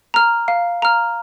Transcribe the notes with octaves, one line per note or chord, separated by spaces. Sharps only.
A#5 F6
F5
A#5 F6